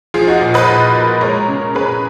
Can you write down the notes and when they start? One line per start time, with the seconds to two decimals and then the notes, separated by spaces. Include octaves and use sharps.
0.14 F3 F4 G#4
0.27 D#4 F#4
0.41 A#2
0.54 B4 D#5
0.69 A#2
0.95 A#3
1.21 G#3 A#4 C#5
1.49 C#3
1.75 C#3 G#4 B4